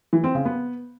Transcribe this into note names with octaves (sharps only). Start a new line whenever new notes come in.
E3
C4
C#3
B3